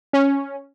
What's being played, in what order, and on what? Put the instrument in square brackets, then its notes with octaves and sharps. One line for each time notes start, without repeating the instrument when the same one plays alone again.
[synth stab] C#4